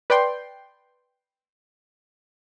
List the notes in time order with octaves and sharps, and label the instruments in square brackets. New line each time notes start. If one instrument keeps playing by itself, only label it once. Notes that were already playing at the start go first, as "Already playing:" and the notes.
[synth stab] B4 D5 G5 C6